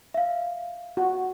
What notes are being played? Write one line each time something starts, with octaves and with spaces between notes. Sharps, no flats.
E5 F5
F#4